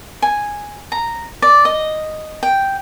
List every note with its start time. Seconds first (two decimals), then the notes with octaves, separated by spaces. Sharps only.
0.22 G#5
0.92 A#5
1.42 D5
1.65 D#5
2.43 G5